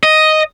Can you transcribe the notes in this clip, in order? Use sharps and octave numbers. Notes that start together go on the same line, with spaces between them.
D#5